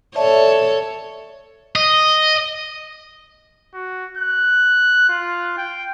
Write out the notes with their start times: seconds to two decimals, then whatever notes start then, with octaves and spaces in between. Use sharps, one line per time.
0.16 A4 C#5 D5 E5 A5
1.75 D#5
3.74 F#4
4.17 F#6
5.09 F4
5.58 G5